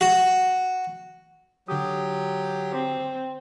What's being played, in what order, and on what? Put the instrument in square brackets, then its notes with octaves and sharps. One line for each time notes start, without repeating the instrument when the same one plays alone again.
[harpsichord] F#4
[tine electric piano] D3 D#6 [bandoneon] F#3 G4
[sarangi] C4